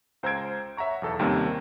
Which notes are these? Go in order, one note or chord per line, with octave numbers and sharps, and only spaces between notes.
C#2 C5 A#5 E6 G#6 D7
C#5 E5 F#5 A#5 C#6
B1 E2 A4 E6
D#2 C3 D#3 G3 A#3 C#4